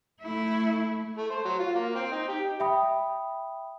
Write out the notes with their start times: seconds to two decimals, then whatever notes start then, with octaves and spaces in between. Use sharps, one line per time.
0.21 A3 E4
1.18 A3
1.30 C5
1.45 F#3
1.59 F4
1.75 A#3
1.95 C4
2.12 D#4
2.28 G4
2.60 E5 G5 B5 D#6